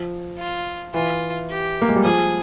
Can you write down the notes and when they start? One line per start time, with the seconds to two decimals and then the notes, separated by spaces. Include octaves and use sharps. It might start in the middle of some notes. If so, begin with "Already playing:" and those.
Already playing: F3
0.38 F4
0.93 E3 F4
1.49 G4
1.82 A#3
1.89 G#3
1.96 G3
2.03 F3 G#4